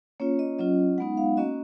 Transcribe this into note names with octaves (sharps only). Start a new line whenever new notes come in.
A#3 C#4 F4 C#5
D#5
F#3 C#4 F4 D#5
G#3 B3 D#4 F#5
F5
A#3 C#4 F#4 D#5